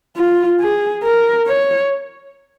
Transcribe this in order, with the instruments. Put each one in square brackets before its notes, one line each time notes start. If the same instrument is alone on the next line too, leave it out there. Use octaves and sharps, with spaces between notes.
[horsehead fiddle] F4
G#4
A#4
C#5